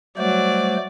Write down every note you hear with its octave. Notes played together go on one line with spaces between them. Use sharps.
F#3 G3 A3 C5 D5